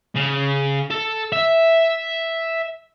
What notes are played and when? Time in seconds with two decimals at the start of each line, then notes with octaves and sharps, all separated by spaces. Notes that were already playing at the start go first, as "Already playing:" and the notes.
0.16 C#3
0.91 A4
1.32 E5